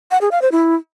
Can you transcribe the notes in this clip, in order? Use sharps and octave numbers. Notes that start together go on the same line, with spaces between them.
F#5
G#4
F5
C5
E4